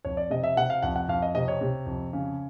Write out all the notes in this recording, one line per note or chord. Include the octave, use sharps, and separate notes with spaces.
F2 C#5
D5
C3 D#5
E5
C3 F#5
F5
F2 F#5
F#5
F2 F5
D#5
C3 D#5
C#5
C3
F2
C#3